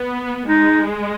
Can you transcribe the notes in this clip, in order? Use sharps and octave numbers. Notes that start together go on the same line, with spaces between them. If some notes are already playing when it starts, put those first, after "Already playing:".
Already playing: B3
G#3 D#4